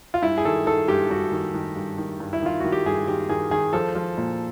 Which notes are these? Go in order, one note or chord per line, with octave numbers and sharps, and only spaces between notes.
F4
G2 E4
G#4
D#3 A4
D#3 A4
G2 G4
G2 F#4
D#3
D#3
G2
D#3
G2
E4
D#3 F4
D#3 F#4
G4
G2 G#4
D#3 G4
D#3 G#4
D#3 G#4
F3 A4
F3
A#2